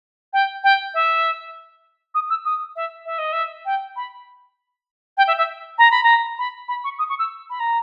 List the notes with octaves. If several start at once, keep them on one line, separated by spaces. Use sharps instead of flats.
G5
G5
E5
D#6
E6
D#6
E5
E5
D#5
E5
G5
B5
G5
E5
E5
A#5
B5
A#5
B5
B5
C#6
D#6
C#6
E6
B5
A#5